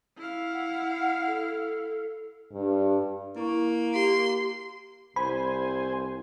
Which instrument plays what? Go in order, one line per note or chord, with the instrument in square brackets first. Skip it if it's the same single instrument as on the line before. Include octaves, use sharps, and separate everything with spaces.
[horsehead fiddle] E4 F5
[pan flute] F#5
A4
[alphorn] G2
[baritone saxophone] A#3 [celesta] E4 C#6
[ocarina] G4 [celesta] F5 [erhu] C6
[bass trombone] C2 [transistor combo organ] C5 G#5 [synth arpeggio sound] B5